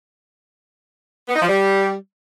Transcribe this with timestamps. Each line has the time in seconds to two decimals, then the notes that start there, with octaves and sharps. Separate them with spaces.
1.29 B3
1.35 D#4
1.42 F3
1.49 G3